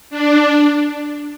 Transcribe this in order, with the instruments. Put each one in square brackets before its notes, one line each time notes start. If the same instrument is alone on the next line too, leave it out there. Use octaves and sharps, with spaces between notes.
[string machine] D4